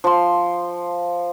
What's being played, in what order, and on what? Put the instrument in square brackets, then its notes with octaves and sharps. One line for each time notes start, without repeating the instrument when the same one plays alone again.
[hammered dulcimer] F3 C6